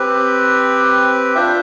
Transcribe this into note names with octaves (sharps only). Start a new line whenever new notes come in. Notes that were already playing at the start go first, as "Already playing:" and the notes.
Already playing: C4 G4 B4
D4 F4 C5 E5